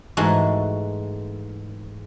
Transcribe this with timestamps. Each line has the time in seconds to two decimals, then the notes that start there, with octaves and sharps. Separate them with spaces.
0.17 G#2 E3 G#3 A3 F#4